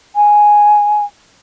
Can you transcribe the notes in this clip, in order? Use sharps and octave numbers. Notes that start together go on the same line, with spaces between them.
G#5